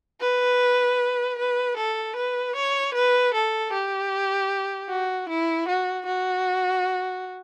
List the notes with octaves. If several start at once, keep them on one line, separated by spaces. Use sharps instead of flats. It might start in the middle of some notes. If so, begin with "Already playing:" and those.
B4
B4
A4
B4
C#5
B4
A4
G4
F#4
E4
F#4
F#4